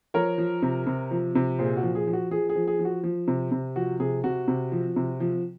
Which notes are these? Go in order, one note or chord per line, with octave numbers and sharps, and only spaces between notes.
F3 A#4 C#5
F3
C3
C3
F3
C3
A#2 G#4 C5
F#4
F3
G#4
F3
F#4
F3 G#4
G#4
F3
G#4
F3
F#4
F3
C3
C3
F3 F#4
C3 G#4
C3 F#4
C3
F3
C3
F3